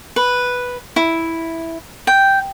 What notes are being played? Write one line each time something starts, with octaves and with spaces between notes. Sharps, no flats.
B4
E4
G5